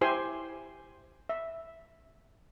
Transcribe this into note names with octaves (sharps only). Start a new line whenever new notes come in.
E4 G4 C5 G#5 C6
E5